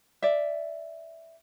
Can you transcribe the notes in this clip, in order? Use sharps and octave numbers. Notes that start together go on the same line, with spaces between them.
D5 E5